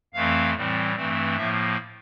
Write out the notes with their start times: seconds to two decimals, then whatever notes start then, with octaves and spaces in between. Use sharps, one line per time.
0.13 F2 E3 A3 C4 F5
0.54 A2 E3 G3 C4
0.95 G2 E3 A3 C4
1.36 A2 F3 A#3 E5